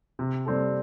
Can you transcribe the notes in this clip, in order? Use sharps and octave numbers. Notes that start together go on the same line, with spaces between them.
C3
G3 C4 A4